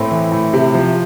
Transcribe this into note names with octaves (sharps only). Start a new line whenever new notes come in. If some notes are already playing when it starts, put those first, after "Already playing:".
Already playing: A2 A3 C4
E3
A2
C3
F3